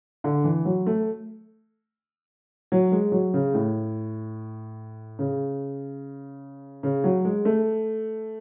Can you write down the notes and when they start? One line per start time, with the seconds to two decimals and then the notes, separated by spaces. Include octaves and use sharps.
0.24 D3
0.44 E3
0.65 F#3
0.86 A3
2.72 F#3
2.92 G#3
3.12 F#3
3.34 C#3
3.54 A2
5.19 C#3
6.83 C#3
7.04 F#3
7.25 G#3
7.45 A3